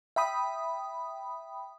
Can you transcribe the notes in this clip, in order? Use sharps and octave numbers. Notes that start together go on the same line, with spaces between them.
E5 G5 B5 D#6